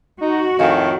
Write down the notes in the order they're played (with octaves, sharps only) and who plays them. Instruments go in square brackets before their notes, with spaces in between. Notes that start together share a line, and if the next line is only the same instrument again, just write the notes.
[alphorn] D#4 [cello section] F#4
[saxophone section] F2 D#3 [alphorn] A2 [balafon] D#5 F5 G#5